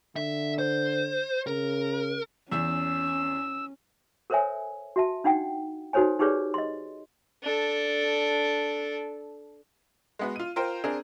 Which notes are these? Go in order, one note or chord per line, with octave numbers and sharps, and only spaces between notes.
D3 E5
C5
C#3 A#4
E2 C#4 E6
A4 A#4 C5 C#5 E5 G#5
F#4 E5 A5
D4 D#4 F#5 G5
D#4 F#4 A4 C5 C#5 G#5
D#4 G4 G#4 B4 C#5 D5
D#5 C6
D4 A4
G#3 B3 F#4
F4 D#7
F4 A#4 C5 G5
C4 D4 G#4 A#4